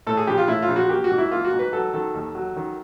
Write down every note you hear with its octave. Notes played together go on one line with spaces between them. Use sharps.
A2 A4
G#4
A#1 G4
F4
A2 E4
F4
A#1
F#4
A#3 G4
F#4
G#2
E4
A#3 F4
F#4
G#2
B4
F#3 A4
D#3 A4
D#2
F#3
D#3